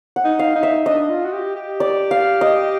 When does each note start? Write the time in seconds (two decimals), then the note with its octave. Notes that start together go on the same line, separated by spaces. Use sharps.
0.16 F#5
0.24 D#4
0.39 F5
0.55 D#4
0.63 E5
0.86 D4 D#5
1.10 F4
1.25 F#4
1.33 G4
1.56 G4
1.80 D5
2.11 F5
2.41 D#5